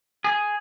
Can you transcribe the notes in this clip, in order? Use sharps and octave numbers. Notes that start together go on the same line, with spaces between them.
G#4